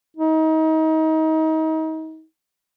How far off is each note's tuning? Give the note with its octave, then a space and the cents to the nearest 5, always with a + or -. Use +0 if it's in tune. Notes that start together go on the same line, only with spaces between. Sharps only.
D#4 +30